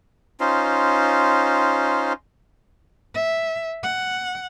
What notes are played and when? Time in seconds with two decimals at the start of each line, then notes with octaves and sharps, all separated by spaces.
0.40 C#4 D#4 F4 C5
3.15 E5
3.83 F#5